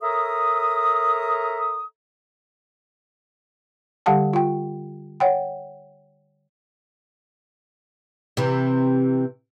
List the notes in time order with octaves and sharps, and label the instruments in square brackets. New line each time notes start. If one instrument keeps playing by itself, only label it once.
[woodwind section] A4 A#4 C#5 E5 A#5 D#6
[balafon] D3 G3 G4 F5 F#5 A5
F4 G5
C#5 F#5 G5
[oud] C3 E3